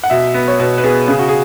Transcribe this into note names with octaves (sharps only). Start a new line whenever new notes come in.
F#5
B2 E5
B3
C#5
B2 B4
B4
B3 G#4
C#3 G#4
F#4
G#4